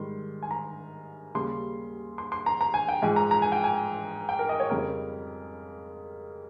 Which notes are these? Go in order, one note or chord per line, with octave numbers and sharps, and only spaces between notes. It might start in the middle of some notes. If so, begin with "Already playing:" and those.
Already playing: G#2 D#3 G3 C6
G#5
A#5
D#2 C#3 G3 C6
C6
C6
A#5
A#5
G#5
G5
G#2 F3 G#3 G#5
A#5
A#5
G#5
G5
G#5
G5
A#4
D#5
C#5
F2 C#3 G3 A#4